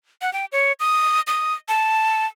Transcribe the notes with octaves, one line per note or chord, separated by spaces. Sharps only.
F#5
G5
C#5
D#6
D#6
A5